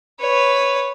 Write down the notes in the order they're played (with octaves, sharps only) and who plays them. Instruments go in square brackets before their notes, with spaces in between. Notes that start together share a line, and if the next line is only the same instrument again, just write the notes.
[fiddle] B4 C#5